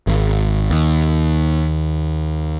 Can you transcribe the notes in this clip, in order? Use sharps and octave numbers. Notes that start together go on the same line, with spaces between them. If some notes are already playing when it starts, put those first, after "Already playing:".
G#1
D#2